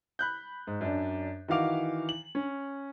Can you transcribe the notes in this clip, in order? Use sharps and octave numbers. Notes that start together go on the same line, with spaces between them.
B5 F#6 G6
G#2
F#2 D4
D#3 E3 F#4 F5 D6 F7
F#7
C#4